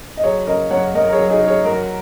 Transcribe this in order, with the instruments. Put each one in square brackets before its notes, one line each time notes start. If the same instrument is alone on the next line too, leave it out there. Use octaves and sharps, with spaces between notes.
[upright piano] D#5
F#3 G#4 C#5
C#3 A#4 D#5
F#2 C#5 F#5
F#2 A#4 D#5
A#4
G#4 C#5
F#3
D#4 G#4
C#3
G#4 C#5
F#2 F#4 A#4